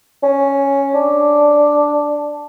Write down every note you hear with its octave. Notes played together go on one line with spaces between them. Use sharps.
C#4
D4